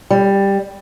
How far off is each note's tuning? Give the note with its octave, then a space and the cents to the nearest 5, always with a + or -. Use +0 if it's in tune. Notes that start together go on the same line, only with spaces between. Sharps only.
G3 +10